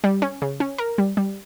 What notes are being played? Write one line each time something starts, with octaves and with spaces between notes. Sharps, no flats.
G3
C#4
C#3
C#4
A#4
G3
G3